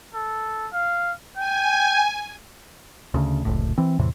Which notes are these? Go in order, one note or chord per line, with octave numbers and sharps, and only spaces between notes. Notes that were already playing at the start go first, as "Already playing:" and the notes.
A4
F5
G5 G#5
D2 C#3
F1 C#2 A2
E3 C4
E2 A2 C3 E3